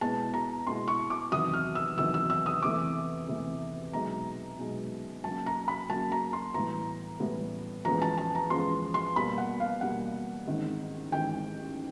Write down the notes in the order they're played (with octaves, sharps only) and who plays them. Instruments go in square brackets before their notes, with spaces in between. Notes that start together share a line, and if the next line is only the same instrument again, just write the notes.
[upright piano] B2 G#3 B3 E4 [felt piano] A5
[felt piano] A#5
[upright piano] B2 G#3 B3 E4 [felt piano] C6
[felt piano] C#6
D6
[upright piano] E2 C3 D#3 F#3 [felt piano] D#6
[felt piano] F6
E6
[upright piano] E2 C3 D#3 F#3 [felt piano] E6
[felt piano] E6
E6
D#6
[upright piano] E2 C3 E3 A3 [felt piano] D6
[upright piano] E2 C3 E3 A3
[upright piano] B1 B2 G#3 [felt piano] A#5
[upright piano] B1 B2 G#3
[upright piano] C#3 F#3 A#3 [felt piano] A5
[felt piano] A#5
B5
[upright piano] C#3 F#3 A#3 [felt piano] A5
[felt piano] A#5
C6
[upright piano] A2 E3 G3 B3 [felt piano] A#5
[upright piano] A2 E3 G3 B3
[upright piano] E2 C#3 F3 G#3 B3 [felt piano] A#5
[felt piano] A5
A5
A#5
[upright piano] E2 C#3 F3 G#3 B3 [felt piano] C6
[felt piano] C6
[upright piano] B2 G3 A#3 [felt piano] B5
[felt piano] F#5
F5
[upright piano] B2 G3 A#3 [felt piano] F#5
[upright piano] A1 G#2 D#3 G#3 C4
[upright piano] A1 G#2 D#3 G#3 C4 [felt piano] G5